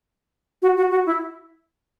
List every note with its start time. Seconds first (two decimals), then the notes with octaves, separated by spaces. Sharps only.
0.62 F#4
0.77 F#4
0.91 F#4
1.06 E4